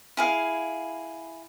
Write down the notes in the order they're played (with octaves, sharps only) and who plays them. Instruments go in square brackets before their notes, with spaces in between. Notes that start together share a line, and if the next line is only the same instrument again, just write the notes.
[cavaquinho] E4 G#4 F5